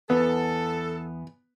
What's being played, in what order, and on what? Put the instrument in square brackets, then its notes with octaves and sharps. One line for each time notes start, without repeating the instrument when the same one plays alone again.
[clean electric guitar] E2 [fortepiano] B3 [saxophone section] A4